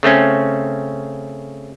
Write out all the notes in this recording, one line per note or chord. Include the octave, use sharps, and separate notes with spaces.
C#3 A3 C4 C#4